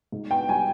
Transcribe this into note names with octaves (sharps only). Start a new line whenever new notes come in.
G#2
B3 G5
G3 G#5